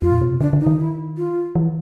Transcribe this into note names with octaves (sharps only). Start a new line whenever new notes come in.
F2 F4
A#2
B2
C3
D3 D4
D3
D#4
D#3
E4
F4
E3